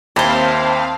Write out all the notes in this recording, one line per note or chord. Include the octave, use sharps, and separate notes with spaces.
D#2 C4 E4 C5 F5 A5